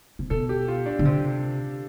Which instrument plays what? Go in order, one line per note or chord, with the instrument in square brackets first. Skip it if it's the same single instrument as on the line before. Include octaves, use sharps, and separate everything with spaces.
[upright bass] C3
[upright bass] B2 [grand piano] A4
[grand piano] G4
F4
D4
[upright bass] D3
C3